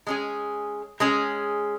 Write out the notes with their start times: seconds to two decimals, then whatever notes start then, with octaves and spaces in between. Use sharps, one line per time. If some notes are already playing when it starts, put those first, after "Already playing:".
0.07 G#3 C#4 G#4
1.00 G#3 C#4 G#4